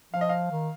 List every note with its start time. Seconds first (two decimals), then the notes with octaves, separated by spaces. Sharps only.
0.13 F3 F5
0.21 D#5
0.29 F5
0.51 D#3